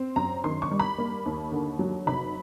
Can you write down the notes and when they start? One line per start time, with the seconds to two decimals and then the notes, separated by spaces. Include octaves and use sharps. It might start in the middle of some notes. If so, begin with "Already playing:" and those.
Already playing: C4
0.16 F#2 A#5
0.44 D#3 C6
0.62 C#6
0.71 G3
0.80 B5
0.98 A#3
1.26 D#2
1.52 D3
1.79 F#3
2.07 F1 B5